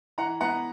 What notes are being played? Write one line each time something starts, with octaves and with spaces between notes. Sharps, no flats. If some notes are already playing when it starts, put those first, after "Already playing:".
E3 F#5 A#5
B3 F#5 A#5